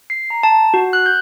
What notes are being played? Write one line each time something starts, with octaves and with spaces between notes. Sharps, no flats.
C7
A#5
A5
F#4
F#6
G6